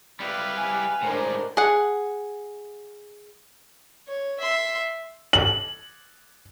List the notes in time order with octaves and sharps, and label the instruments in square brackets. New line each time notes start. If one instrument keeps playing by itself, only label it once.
[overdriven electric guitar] G3 E4 [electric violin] B4 F5
[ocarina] G#5
[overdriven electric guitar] A2 G#3 [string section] D4 A#4 C5
[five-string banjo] G#4 F#5
[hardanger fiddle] C#5
E5 C6
[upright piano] F#7